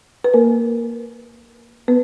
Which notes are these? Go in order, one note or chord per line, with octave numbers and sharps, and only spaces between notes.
B4
A#3 A#4
B3 B4